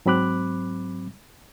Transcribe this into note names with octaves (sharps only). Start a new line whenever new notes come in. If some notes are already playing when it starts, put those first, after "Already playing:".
G#2 F#3 C4 B5 D6 F#6